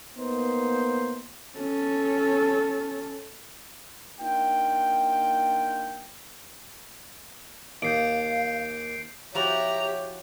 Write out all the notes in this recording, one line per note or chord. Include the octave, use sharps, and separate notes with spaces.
A#3 B3 D#4 C5
C#4 A4
A#3 D4 D#4 F4 G5
D#2 F5 G6 C7 D7
F3 E4 F#4 G4 C#5 A#5